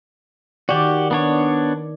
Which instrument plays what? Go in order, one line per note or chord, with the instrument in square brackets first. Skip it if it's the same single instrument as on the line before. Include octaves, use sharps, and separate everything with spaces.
[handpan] D#3 D5 [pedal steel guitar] F#4 G4
[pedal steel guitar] B3 D4 C#5